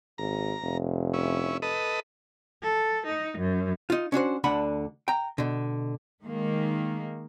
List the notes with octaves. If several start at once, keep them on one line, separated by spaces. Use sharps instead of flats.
G#1 A#5
F1
C#4 E4
A4 B4 D#5
A4
D#4
F#2
D#4 F4
C#4 D4 F#4 C5
D2 D3 D4 F#5 B5
G5 A#5
B2 D3
D#3 G#3 A#3